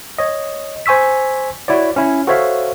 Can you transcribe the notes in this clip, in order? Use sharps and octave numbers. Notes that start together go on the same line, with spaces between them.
C#5 D#5
C5 G#5 C#6 E6 B6
E4 F#4 C#5 D5
C#4 E4
F#4 A4 C5 C#5 E5 F5